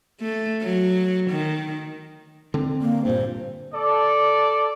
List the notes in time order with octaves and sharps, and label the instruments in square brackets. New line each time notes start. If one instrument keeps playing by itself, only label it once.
[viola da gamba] A3
F#3
D#3
[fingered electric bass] D3 C4 D4
[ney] A#3
[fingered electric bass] G2 A#2 [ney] C5
[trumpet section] A4 D5